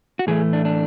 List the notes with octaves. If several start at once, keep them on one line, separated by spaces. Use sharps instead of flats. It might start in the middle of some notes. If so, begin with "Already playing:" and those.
F#4
A2 E3 A3 G#4
D4
D4